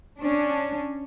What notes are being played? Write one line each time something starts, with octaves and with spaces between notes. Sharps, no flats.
C#4 D4